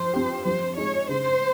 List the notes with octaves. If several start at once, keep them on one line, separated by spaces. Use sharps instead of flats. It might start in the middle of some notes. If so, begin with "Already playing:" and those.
Already playing: F3 C5
C4 G4
F3 C5
G#3 D#4 C#5
C#3 C5